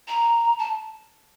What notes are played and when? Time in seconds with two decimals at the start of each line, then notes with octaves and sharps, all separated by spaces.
0.08 A#5
0.59 A5